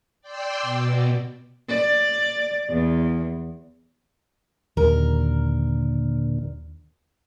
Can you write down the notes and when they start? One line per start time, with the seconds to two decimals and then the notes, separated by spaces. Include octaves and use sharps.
0.22 D5 G5 C6 D6 E6
0.62 B2
1.69 D5
2.70 E2
4.77 D#2 A#2 D3 A#4